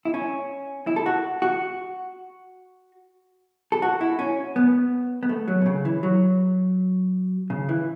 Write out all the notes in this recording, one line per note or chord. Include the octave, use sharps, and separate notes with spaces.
E4
C#4
E4
A4
F#4
F#4
A4
F#4
E4
C#4
B3
B3
A3
F#3
B2
C#3
E3
F#3
C#3
E3